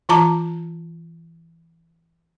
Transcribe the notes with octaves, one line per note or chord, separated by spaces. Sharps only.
E3 F4 A5 A#5 D6